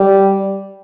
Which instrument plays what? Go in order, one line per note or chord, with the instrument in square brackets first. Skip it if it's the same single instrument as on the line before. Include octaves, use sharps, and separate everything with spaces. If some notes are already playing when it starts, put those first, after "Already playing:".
Already playing: [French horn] G3